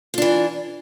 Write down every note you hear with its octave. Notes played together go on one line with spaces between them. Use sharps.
E3 D4 F4